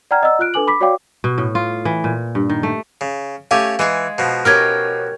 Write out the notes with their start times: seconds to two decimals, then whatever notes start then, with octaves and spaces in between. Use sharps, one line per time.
0.11 D5 F#5 G5 A#5 F6 G#6
0.22 D5 D#5 F#5 A#5 E6
0.39 F4 F6 F#6 D7
0.54 D4 A4 B4 G#5 D6 F#7
0.67 B5 D6 B6
0.81 F#4 C#5 D5 F5 G5 D6
1.24 B2
1.38 A2
1.55 F4
1.85 E3
2.04 A#2
2.35 G2
2.50 D#3
2.63 A3
3.01 C#3
3.51 A3 C#4 G4 F5 G#5
3.79 E3 G#3 G#4
4.18 B2 F3
4.45 C#4 G4 A#4 F6 G#6